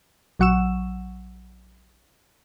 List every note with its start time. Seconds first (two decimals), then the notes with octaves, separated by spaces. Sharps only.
0.39 A#1 F#3 F#5 C#6 E6 E7